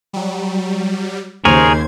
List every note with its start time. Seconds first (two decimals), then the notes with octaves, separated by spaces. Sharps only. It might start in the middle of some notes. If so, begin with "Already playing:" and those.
0.13 F#3 G3
1.45 D#2 C#3 G#4 A#4 C5 C#5 G#6